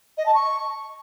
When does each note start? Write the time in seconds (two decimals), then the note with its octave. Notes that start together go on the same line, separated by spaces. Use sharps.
0.18 D#5
0.26 A5
0.34 C#6